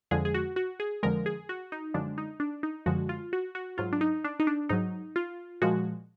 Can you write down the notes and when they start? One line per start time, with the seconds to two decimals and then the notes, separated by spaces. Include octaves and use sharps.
0.11 F2 D3 F3 G#3 G#4
0.25 G#4
0.34 F#4
0.56 F#4
0.80 G#4
1.03 F2 D3 F3 G#3 A#4
1.26 G#4
1.49 F#4
1.72 D#4
1.94 F#2 D3 F3 G#3 D4
2.18 D#4
2.40 D4
2.63 D#4
2.86 F#2 D3 F3 G#3 F#4
3.09 F4
3.33 F#4
3.55 F#4
3.78 G#2 F#3 F4
3.93 D4
4.01 D#4
4.24 D4
4.40 D#4
4.47 D4
4.69 G#2 F#3 D#4
5.16 F4
5.61 A#2 F3 G#3 F#4